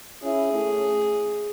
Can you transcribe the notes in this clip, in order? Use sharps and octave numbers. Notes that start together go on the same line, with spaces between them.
C#4 E4 G#4
A3 C#4